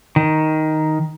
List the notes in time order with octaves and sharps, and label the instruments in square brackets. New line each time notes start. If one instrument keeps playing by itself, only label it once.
[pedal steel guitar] D#3